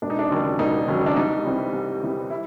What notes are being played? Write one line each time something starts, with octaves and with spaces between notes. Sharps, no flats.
E1 D4
D#4
D4
D#2 C#3 F#3
E1 D#4
D#2 C#3 F#3
D4
C2 D#4
C3 E3 G3
C2
C3 E3 G3
E4